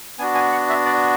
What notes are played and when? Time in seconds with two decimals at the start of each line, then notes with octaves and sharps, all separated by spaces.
0.19 B3 D4 F#4 G#5
0.35 G#5
0.52 F#5
0.69 E5
0.85 D5